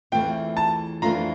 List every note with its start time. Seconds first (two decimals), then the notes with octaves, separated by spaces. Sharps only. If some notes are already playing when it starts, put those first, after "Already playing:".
0.12 E2 E3 A3 C4 F4 G5
0.57 A5
1.02 F2 E3 A3 D4 F4 A#5